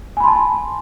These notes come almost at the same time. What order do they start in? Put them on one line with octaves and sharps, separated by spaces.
G#5 B5 C6 A5